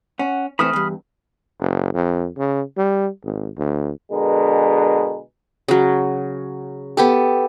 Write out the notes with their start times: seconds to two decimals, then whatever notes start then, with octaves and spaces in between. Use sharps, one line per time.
0.19 C#4 F#5
0.59 E3 A3 C4 B5 D#6 F6
0.73 E2 G2
1.60 F#1
1.94 F2
2.37 C#3
2.78 G3
3.24 G#1
3.58 D2
4.12 B2 D3 G#3 G#4 A#4 B4
5.68 C#3 F#3
6.97 B3 G4 A4